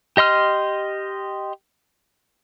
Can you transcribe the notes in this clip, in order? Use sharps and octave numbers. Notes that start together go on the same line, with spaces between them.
G4 D#5 C6 F6